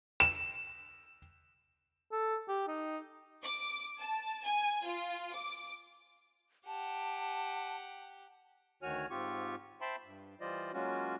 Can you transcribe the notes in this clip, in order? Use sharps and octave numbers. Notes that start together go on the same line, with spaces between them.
E7
A4
G4
D#4
D6
A5
G#5
F4
D6
G4 F#5 A5
D2 D#3 F#4 C#5 G#5 F6
G#2 C4 F4 G4 C#6
C5 E5 G5 A5 B5 C6
G2
E3 G3 F4 C5 D5 D#5
F#3 G#3 A#3 C#4 F4 F#4